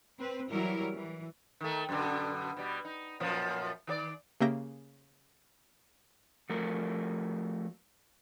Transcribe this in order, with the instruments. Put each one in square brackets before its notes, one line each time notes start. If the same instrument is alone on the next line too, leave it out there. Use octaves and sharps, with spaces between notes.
[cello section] C4 B4 C5
E3 F#3 G3 E4 A#4 C#5
E3
[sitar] D#3 A3
F#2 B2 D3
B2 G3
D#4
F#2 A#2 F3
D#3 F#4 D5
[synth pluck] C#3 A#3 G4 E5 G6 A#6
[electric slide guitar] F3 A3 F#4 A#4